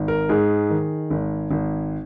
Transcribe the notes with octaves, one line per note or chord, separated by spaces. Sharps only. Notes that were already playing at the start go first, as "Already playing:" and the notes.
Already playing: G#1
A#4
G#2 G#4
D#3
G#1
G#1